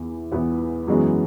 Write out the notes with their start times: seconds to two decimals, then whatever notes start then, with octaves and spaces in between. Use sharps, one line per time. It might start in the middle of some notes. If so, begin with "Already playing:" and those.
Already playing: E2 E3 B3 E4
0.32 E2 E3 B3 E4 B4
0.87 F#2 E3 G#3 B3 F#4